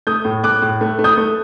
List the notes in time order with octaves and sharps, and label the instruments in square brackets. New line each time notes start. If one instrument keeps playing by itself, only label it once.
[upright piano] A3 D#6 G6
A2
A2 D6 F#6
A2
A3
A3
D#6 G6
A3